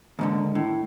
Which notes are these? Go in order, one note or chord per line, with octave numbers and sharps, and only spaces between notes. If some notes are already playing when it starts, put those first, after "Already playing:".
D#2 G#2 D3
A2